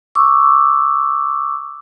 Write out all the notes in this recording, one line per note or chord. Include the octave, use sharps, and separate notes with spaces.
C#6 D6 E6